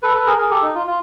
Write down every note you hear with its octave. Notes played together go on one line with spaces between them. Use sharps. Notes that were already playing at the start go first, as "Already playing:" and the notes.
A4 B4
A4 B4
G#4 A#4
G#4 A#4
G4 A4
D#4
F4
F4